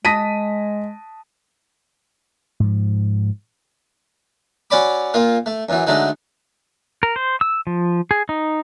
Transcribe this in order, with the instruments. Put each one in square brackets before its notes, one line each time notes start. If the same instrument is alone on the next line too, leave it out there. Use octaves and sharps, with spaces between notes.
[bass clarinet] G#3 [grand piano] A5 D#6 [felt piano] A#6 B6 D#7
[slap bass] G#2 F3
[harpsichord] F#3 C#4 C#5 D5 B5 D6
A#2 A#3 F4
A3
F#2 E3 F#3
D3 F#3 G#3 A3 D#4
[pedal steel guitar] A#4
C5
E6
F3
G#4
D#4